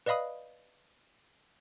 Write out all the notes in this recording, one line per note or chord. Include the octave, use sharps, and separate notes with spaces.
B4 D5 D#5 F5 B5 D#6